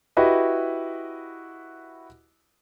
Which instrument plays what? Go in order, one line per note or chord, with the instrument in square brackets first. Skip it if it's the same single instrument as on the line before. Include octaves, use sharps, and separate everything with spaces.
[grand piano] E4 F#4 G4 B4 D#5